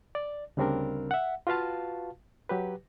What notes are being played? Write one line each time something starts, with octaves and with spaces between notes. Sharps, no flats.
D5
D2 C#3 G3 C4 D4 A#4
E5 F#5
F4 F#4 B4 F5 A5
F#3 G4 B4